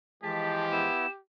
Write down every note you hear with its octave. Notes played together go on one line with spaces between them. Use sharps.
E3 F3 G#3 G4 A5 B6
B3 E4 E7